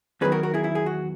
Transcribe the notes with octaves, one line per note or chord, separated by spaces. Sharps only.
E2 D#3 F#3 G#4 B4
F#4 A#4
F#4 A#4
E4 G#4
E4
G#4
F#4